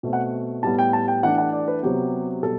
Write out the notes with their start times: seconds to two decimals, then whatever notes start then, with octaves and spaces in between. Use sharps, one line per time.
0.03 B2 A3 C4
0.13 F#5
0.63 A2 G3 B3 A5
0.79 G5
0.93 A5
1.08 G5
1.23 E3 A3 D4 F#5
1.38 F#5
1.53 D5
1.68 B4
1.83 C3 F#3 B3 G4
2.43 B2 G3 A4